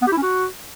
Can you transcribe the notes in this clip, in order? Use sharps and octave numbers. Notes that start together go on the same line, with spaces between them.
B3
G4
E4
C#4
F#4